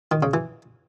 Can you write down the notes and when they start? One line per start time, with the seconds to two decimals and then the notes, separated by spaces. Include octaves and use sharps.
0.11 D#3
0.23 C#3
0.34 E3